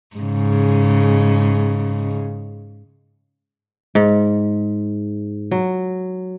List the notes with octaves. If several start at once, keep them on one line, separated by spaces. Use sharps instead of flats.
G#2 C#3
G#2
F#3